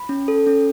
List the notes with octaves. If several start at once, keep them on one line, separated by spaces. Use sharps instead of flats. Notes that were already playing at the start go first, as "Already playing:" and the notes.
Already playing: B5
C#4
A4
C#4